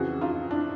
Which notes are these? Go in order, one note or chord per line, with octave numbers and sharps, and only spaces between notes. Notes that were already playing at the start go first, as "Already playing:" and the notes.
Already playing: F2 C#3 E3 F#4 G#4
D#4 F4
D4 E4